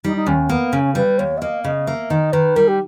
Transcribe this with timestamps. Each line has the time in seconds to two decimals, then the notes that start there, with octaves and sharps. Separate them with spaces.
0.04 G3 D#4
0.16 D#4
0.27 D#2 C#4
0.49 A#3 B3
0.73 C#3 C#4
0.95 G3 B4
1.18 D#2 C#5
1.37 E5
1.42 A#3 D#5
1.64 C#3 D#5
1.87 A#3 E5
2.10 D#3 D#5
2.32 D#3 B4
2.56 G3 A#4
2.68 G4